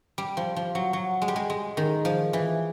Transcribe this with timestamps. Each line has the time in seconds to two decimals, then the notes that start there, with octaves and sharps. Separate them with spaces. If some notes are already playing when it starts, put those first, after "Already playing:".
0.18 G3
0.37 F3
0.56 F3
0.75 F#3
0.93 F#3
1.22 G#3
1.28 G3
1.36 G#3
1.50 G#3
1.77 D#3
2.05 F3
2.33 E3